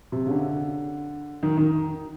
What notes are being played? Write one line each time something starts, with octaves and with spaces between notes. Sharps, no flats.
C3
C#3
D3
D#3
D#3